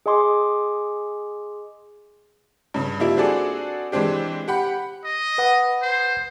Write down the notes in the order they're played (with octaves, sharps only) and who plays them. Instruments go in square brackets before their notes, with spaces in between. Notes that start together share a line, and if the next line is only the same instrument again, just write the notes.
[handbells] G#4 D#5 G#5 C6 D6
[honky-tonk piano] G2 C#3
F3 G3 A#3 E4
C4 D4 F#4 G#4 A4 D5
E3 G#3 C4 D4 G4
G4 F#5 B5
[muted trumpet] D#5
[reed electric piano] B4 F#5 D#6
[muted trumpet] C5